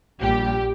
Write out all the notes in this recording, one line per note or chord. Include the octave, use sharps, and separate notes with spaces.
A#1 A#2 G3 G4